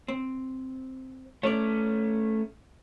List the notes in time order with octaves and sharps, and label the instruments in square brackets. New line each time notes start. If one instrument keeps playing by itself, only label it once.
[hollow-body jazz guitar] C4
[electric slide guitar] A3 C#4 [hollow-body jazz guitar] C#5 D5